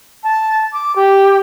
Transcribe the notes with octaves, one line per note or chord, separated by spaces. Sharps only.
A5
D6
G4